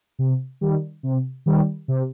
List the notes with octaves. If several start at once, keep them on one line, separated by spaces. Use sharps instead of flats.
C3
D#3 G3
C3
D#3 G3
C3